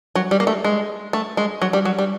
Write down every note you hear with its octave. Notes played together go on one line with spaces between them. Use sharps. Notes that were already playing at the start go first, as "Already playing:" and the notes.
F#3
G3
A#3
A3
G#3
A3
G#3
F#3
G3
F#3
G3